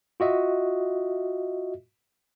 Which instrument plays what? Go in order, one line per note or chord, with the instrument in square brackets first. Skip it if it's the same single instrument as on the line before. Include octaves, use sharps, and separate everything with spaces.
[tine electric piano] F4 F#4 D#5 E5